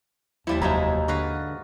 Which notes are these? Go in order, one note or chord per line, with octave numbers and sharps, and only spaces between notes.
D#2 F3 G3 E4 E5
F1 G#2 F#3 D#4 E4 E5 A5 A#5
D3 F#4 B4 F5